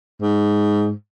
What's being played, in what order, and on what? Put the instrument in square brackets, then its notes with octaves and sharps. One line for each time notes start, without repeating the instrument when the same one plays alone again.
[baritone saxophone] G#2